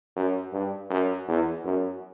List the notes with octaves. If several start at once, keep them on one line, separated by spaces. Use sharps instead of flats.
F#2
G2
F#2
E2
F#2